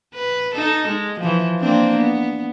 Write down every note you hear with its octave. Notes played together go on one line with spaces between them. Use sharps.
B4
D#4 A4
G#3
E3 F3
A#3 C4 D4
B3